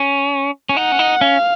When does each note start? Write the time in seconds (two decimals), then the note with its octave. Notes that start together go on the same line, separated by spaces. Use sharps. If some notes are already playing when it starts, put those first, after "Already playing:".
Already playing: C#4
0.69 C#4
0.77 D#4 F#5
0.92 C#4
0.99 D#4
1.21 C#4 F5